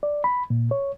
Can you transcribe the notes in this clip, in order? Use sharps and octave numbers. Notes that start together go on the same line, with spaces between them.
D5
B5
A#2
C#5